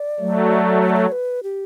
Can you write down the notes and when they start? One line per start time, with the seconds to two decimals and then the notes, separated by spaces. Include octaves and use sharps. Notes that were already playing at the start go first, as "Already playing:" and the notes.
Already playing: D5
0.20 F#3 A3
0.81 C#5
0.90 D5
0.96 C#5
1.12 B4
1.43 G4